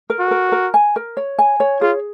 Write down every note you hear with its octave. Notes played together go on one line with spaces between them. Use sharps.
A#4
F#4
A#4
A#4
G#5
A#4
C#5
G#5
C#5
F4 G#4